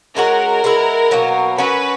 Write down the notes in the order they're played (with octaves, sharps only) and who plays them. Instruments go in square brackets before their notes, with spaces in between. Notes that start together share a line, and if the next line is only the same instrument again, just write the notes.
[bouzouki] G#3 C#4 F#4 [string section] A#4
[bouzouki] G#3 B3 E4
B2 F#3 A#3
[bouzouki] F#3 C#4 F#4 [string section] B4